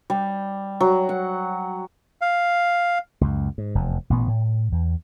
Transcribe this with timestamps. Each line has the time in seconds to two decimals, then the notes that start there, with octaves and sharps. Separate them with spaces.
0.10 G3
0.80 F#3
1.09 F#5
2.21 F5
3.21 C#2 F#2
3.58 G#2
3.75 F1 E2
4.10 A1 A#2 B3
4.27 A2
4.72 E2